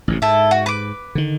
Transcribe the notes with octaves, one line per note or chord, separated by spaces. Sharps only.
A1 A2 C3
G#2 E4 A4
F#4
B4 D6
D3 D#3